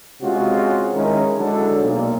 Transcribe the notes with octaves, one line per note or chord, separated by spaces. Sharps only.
C3 G#3 C#4 F4 F#4
D#3 G#3 C#4 E4 A#4
D3 F#3 G#3 D4 E4 A4
B1 A#2